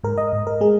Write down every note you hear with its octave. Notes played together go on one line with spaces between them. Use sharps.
G#2 A#4
D#5
G#2
A#4
G#3 G#4